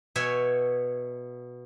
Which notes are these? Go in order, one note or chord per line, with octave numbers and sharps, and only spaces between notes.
B2 C#5 E5 G#5